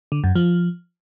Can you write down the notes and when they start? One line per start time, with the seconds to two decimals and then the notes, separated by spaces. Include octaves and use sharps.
0.12 D3
0.24 F#2
0.35 F3